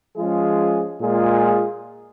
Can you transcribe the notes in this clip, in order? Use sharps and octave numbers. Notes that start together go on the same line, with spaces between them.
F3 G#3 C#4 F4 G#4
A#2 G#3 F4 G#4